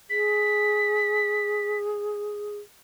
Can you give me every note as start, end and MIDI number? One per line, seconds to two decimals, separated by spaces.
0.10 2.58 68
0.10 1.78 95